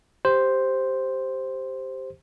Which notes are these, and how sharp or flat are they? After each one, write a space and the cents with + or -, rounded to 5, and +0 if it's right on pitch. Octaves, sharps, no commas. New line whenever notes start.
G4 +0 C5 +0